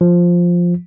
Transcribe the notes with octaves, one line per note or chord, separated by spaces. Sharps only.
F3